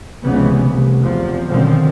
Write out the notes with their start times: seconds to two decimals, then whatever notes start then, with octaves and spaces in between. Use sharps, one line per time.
0.22 F1 C#2 C#3 E3 B3
0.68 F1 C2
1.02 E2 C3 F3
1.49 F#2 B2 D3 D#3 F3 C4